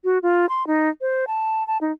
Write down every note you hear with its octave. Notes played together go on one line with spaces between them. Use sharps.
F#4
F4
C6
D#4
C5
A5
A5
D#4